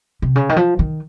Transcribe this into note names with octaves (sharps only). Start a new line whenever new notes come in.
C3
C#3
D#3
F3
D#3